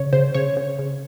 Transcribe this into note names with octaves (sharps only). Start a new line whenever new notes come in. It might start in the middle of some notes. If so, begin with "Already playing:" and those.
Already playing: C#3 C#5
C#3 C5
C#3 C#5
C#3
C#3